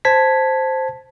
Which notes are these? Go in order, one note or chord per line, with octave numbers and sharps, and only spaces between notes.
C5 A5 G#6 B6